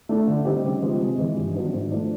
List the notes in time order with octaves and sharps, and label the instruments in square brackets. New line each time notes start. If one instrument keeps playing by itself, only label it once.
[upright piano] A3 D4
D3
G3 C4 D#4 G4
C#3
F3 G#3 B3
C3
E3 G#3
G2
D#3 F#3 B3 D4
G#2
F3 A3 D4